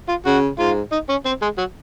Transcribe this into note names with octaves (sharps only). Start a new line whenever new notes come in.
F4
C#3 F#4
G#2 F4
D#4
C#4
C4
G#3
F#3